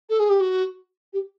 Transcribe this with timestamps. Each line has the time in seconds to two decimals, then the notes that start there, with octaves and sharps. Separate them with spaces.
0.10 A4
0.20 G#4
0.30 G4
0.40 F#4
1.13 G4